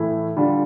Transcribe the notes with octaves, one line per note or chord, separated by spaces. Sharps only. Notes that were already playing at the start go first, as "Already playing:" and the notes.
Already playing: A2 E3 A3 E4
D3 G3 D4 F4